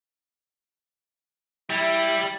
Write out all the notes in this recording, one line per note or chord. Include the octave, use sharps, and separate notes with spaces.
G3 E4